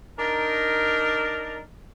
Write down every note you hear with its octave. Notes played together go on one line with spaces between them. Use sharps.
D4 D#4 A#4